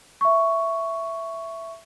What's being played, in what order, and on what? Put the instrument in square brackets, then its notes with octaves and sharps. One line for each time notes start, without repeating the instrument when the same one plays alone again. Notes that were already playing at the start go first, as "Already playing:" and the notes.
[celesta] E5 C#6